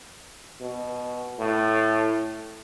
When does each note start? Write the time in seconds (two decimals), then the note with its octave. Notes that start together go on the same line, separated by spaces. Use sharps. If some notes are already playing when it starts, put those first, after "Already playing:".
0.61 B2
1.39 A2